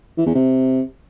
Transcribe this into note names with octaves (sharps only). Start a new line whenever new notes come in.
E3
E2
C3